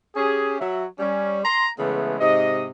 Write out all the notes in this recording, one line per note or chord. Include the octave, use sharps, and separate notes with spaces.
C#4 G4 G#4
F#3 E5
G3 C#4
A#5 C6
C#3 E3 G#3 A3 B3
G#2 C3 D#5